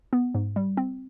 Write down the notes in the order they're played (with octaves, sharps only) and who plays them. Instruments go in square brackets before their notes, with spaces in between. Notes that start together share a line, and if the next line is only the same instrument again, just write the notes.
[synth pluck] B3
G#2
G3
C4